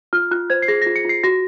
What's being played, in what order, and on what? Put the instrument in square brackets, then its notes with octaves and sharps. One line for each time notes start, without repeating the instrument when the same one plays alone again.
[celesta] F4 F6
F4 F#6
C5 G#6
C7
G#4 A#6
F4 A#6
C#7
F4 C7
F#4 A#6